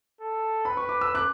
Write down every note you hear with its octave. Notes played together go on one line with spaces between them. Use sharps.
A4
B4 B5
C#6
D6
E6
D6 F#6